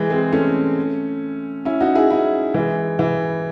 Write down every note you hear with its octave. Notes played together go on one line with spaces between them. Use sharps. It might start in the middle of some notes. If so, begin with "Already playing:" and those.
Already playing: E3 G#3
G#3 C4
A3 C#4
C#4 E4
D#4 F#4
E4 G#4
C#4 E4
E3 G#3
E3